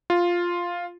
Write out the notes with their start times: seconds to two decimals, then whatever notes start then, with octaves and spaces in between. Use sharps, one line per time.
0.10 F4